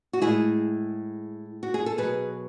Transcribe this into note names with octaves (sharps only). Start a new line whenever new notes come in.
F#4
A2 G#3 E4 G#4
F#4
G#4
A4
B2 F#3 G#4 B4